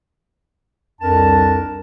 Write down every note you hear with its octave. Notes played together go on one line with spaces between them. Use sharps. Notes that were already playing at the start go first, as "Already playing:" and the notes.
C2 F2 D4 A#4 A5